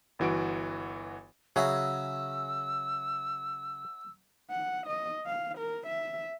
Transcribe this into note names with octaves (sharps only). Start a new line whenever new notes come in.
G1 E3 F#4 D7
C#3 F#3 C#4 F#4 G#4 E5 E6
F#5
D#5
F5
A#4
E5